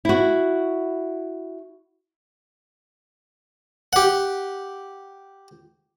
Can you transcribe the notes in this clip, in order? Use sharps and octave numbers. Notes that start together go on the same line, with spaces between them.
E4 F#4
G4 F#5